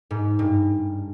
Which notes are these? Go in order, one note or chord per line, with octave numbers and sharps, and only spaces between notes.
G#2
G2